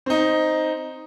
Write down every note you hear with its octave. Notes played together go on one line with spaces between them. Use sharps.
C4 D#4